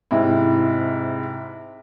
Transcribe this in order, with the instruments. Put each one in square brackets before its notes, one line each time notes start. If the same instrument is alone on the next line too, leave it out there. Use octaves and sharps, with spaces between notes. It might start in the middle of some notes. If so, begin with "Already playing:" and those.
[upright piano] G#2 C3 E4